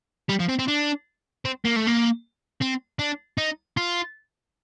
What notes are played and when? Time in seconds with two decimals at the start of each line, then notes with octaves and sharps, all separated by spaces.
0.29 G3
0.40 F3
0.49 C4
0.59 C4
0.68 D4
1.45 C4
1.65 A#3
1.76 A3
1.87 A#3
2.62 C4
2.99 D4
3.38 D#4
3.77 F4